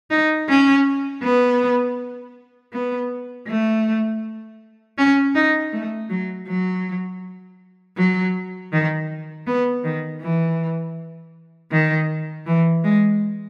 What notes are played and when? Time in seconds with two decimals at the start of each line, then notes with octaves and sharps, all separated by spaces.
0.11 D#4
0.49 C#4
1.23 B3
2.73 B3
3.47 A3
4.98 C#4
5.35 D#4
5.72 A3
6.10 F#3
6.48 F#3
7.97 F#3
8.72 D#3
9.47 B3
9.84 D#3
10.22 E3
11.71 D#3
12.46 E3
12.84 G#3